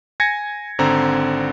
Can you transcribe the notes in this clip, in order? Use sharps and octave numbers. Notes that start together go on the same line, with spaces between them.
G#5 G#6 A#6 C#7
G#1 D3 C4 A#5